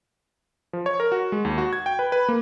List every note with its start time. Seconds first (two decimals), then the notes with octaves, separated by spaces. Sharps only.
0.73 F3
0.86 C#5
1.00 A#4
1.12 F#4
1.32 G#3
1.45 D#2
1.58 F#4
1.73 G#6
1.86 G5
1.99 B4
2.12 B4
2.29 A#3